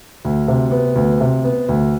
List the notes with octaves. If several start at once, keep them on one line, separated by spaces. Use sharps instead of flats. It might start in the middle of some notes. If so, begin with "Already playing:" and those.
D2
C3
B3
D2
C3
B3
D2